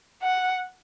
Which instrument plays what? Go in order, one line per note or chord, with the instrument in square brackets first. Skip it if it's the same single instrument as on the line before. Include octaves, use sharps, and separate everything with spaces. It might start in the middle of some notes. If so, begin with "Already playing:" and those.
[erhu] F#5